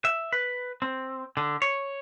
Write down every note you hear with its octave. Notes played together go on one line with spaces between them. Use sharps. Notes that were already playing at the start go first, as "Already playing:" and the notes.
E5
B4
C4
D3
C#5